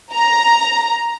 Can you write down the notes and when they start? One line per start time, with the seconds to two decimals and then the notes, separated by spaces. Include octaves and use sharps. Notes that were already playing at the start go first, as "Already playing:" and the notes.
0.12 A#5